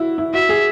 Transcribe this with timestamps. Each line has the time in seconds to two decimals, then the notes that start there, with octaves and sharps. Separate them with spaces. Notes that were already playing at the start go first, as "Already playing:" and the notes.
Already playing: E4 F#4
0.18 E4
0.34 F#4 E5
0.49 G#4